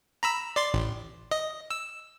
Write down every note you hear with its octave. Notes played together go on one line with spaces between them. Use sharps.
A#5 B5 E6
D5 C6 A6
A1
D#5
E6